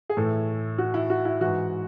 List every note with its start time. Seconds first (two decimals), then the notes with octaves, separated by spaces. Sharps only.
0.10 G#4
0.17 A2 E3 A3 A4
0.78 F#4
0.94 E4
1.10 F#4
1.25 E4
1.41 G#2 E3 F#4